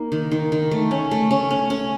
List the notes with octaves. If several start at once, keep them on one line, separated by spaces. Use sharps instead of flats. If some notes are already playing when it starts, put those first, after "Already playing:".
Already playing: A#3 D#4
D#3
D#3
D#3
A3
C#4
A3
C#4
C#4
C#4